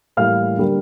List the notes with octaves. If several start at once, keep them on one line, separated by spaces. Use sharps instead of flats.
A2 E3 G3 A#3 F5 F6
D3 G3 A#3